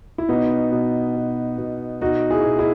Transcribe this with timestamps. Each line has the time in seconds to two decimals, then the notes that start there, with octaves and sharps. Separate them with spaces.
0.18 E4
0.29 B2 B3 D#4
0.72 B2
1.16 B2
1.58 B2
2.01 B2 D#4 F#4
2.31 E4 G#4
2.44 B2
2.59 E4 G#4